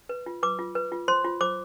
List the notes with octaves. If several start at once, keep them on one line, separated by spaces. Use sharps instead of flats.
B4
F4
B4 D6
F4
B4
F4
C5 C6
F4
C5 D6